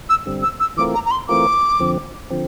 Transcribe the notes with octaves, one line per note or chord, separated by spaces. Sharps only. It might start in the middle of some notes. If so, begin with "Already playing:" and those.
E6
G2 D3 G3 C4
E6
E6
E3 A3 C4 F4 A#4 D6
A#5
A#5
C6
E3 A3 C4 F4 A#4 D6
F2 D3 F3 C4
D3 F3 C4